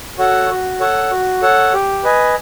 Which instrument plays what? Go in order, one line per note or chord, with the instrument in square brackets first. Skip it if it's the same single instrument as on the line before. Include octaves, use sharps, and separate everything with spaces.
[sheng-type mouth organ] F#4 A4 C#5 F#5
F#4
A4 C#5 F#5
F#4
A4 C#5 F#5
G4
B4 D#5 G#5